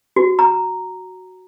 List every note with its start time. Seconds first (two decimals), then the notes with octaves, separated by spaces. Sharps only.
0.16 F#4
0.39 A#5